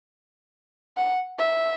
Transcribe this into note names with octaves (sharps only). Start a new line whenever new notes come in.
F#5
E5